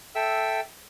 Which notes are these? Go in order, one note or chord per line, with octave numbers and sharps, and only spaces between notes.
A4 E5 G5 E6